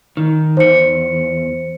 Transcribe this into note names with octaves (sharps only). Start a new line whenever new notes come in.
D#3
E2 C5 C#7